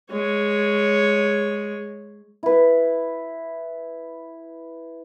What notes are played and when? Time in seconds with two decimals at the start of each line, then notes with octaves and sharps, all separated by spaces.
0.11 G#3 C#5
2.43 E4 B4